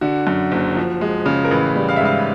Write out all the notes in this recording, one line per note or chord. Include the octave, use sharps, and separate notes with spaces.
D3 F#4
F#2
F#1
F3
G#3
C#3
A#4
A1 B4
G3
F5
E5
G#2 F5